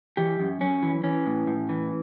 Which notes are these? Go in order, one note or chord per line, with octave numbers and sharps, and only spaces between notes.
E3 G4
F#2
F#2 C#4
E3
E3 C#4
A2
A2
E3